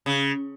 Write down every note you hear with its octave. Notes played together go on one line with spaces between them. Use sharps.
C#3